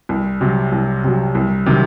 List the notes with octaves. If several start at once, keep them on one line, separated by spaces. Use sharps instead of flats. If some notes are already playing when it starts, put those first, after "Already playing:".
C2
C3 F#3
C2
C3 F#3
C2
C3 D#3 F#3